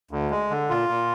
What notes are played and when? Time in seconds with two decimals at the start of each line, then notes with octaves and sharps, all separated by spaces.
0.11 D2
0.30 G#3
0.50 D3
0.70 A#2 F4
0.89 A#2